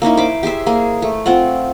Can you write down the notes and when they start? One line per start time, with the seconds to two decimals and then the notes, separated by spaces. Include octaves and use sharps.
0.02 A#3 C#4 D#4 E4
0.17 C5 B5 D6
0.43 G4 G#4 C5 E5
0.67 A#3 G#4
1.02 A3
1.26 C4 F4 F#5